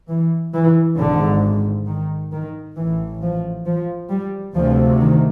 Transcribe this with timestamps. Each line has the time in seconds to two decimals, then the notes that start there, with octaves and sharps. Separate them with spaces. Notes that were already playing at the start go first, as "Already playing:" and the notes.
0.09 E3
0.54 E3
0.98 G#1 G#2 D3
1.87 D#3
2.32 D#3
2.76 A1 A2 E3
3.22 F3
3.66 F3
4.10 G3
4.54 D2 C3 F3
5.00 D#3